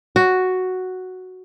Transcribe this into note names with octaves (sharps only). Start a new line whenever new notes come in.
F#4